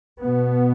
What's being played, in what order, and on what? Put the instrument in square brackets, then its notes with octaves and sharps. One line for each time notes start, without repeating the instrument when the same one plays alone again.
[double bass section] B2 B3